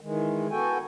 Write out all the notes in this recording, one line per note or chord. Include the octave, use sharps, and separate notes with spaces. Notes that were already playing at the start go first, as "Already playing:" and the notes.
D#3 E3 G#3
B3 F#4 A4 G5 G#5